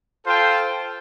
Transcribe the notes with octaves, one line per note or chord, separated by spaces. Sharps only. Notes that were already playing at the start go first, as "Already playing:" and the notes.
F4 A4 C5 G5